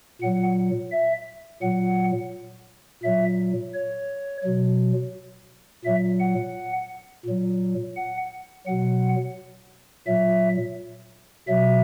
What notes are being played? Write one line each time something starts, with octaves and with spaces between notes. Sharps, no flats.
A#2 F#3 F#5
E5
A#2 F#3 F#5
A#2 F#3 E5
C#5
B2 F#3
A#2 F#3 E5
F#5
A#2 F#3
F#5
B2 F#3 F#5
A#2 F#3 E5
B2 F#3 E5